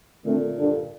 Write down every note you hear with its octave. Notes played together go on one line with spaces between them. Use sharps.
A#2 D3 A3 C4
G2 D3 G3 D4 A4